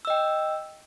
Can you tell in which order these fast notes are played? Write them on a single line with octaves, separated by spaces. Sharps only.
E6 D#5 G5